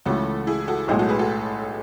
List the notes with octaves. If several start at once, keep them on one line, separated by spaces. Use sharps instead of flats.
C#2 C#3 E3 A3 F#4 A4
E4 G#4
F#4 A4
B1 A2 G#3 D#4 F#4
F#4 A4
G#4 B4
F#4 A4